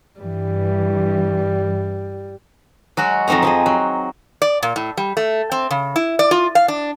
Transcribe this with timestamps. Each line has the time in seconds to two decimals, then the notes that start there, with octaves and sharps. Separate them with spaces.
0.20 G2 E3 G3
2.97 F#3 G#3 F#4
3.28 F2 F#3 C4 D#4 A#5
3.42 F3 C4 G#4
3.66 F#3
4.42 D5
4.63 A#2
4.76 A2
4.97 G3
5.17 A3
5.52 C4
5.71 C#3
5.96 E4
6.19 D5
6.31 F4
6.55 F5
6.68 D4